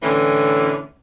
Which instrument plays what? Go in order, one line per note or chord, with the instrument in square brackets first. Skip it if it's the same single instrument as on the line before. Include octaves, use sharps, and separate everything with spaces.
[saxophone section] A2 D3 E3 C#4